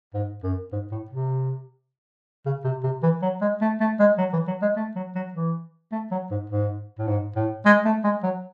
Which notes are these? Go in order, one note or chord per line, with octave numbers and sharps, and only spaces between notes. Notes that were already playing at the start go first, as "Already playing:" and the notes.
G#2
F#2
G#2
A2
C3
C#3
C3
C3
E3
F#3
G#3
A3
A3
G#3
F#3
E3
F#3
G#3
A3
F#3
F#3
E3
A3
F#3
G#2
G#2
A2
G#2
A2
G#3
A3
G#3
F#3